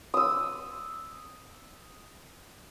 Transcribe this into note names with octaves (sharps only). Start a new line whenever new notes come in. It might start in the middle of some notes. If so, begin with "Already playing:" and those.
D#6 E6